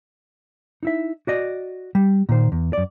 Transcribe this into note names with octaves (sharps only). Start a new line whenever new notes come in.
D#4 E4 E5
F#4 D5 D#5
G3
A#2 D#3 C5
E2
F#2 D5